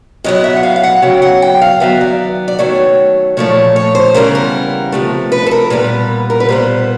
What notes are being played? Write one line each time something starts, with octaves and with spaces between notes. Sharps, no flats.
A2 F#3 B3 D#5
E5
F#5
F5
F5
F#5
C#3 F#3 B3 G5
F#5
G5
F5
D#3 F#3 B3 E5
D5
D5
D#3 F#3 A3 C#5
A#2 F3 A3 C#5
C#5
C5
C#3 E3 G3 B3 A#4
A#4
C3 F3 A3
B4
A4
A#4
A#2 G3 B3 B4
A#4
B4
A#2 G3 B3 C5